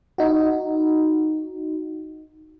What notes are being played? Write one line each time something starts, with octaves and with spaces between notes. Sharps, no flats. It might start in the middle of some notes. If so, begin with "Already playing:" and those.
D#4 F#4